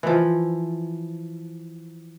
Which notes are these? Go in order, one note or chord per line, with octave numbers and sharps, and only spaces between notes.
E3 F3